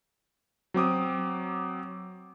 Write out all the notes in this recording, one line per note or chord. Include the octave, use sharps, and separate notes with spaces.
F#3 C4 D6 D#6